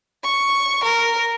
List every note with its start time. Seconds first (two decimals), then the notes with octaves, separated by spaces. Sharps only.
0.24 C#6
0.84 A#4